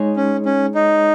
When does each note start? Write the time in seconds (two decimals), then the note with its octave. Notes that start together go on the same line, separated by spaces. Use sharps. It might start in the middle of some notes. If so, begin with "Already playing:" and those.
Already playing: G#3 D#4 G#4 C#5
0.16 C#4
0.46 C#4
0.75 D#4